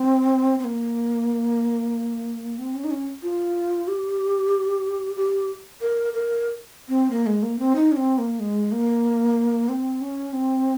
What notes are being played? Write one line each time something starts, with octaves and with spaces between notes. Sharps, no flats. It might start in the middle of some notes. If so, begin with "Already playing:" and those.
Already playing: C4
C4
A#3
C4
C#4
D#4
C#4
F4
G4
G4
A#4
A#4
C4
A#3
G#3
A#3
C4
D#4
C#4
C4
A#3
G#3
A#3
C4
C#4
C4